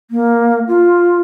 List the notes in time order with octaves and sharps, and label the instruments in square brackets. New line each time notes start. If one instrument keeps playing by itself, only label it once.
[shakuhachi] A#3
F4